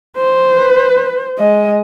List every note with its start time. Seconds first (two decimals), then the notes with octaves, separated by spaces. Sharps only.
0.18 C5
0.56 B4
1.39 G#3 D#5